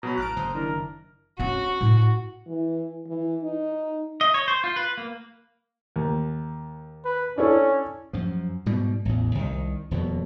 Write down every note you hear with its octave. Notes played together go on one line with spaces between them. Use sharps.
B2 F#3 A#5 B5
A1 A5 F6 F#6 D7
F#1 C5 D#6 G6
D#3 D4 E4 A#4
C4 C#4 F#4
A2
E3
E3
D#4
D#5
C#5
C5
F4
B4
A#3
D#2
B4
C#4 D4 E4 A4
F#2 F3
G#2 B2 G3
A1 E2
C2 D#3
D#1 F2 B2